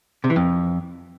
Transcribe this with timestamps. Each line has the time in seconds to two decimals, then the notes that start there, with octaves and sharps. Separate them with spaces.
0.24 C3
0.30 E3
0.36 F2